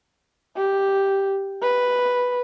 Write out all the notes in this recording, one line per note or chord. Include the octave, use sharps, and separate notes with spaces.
G4
B4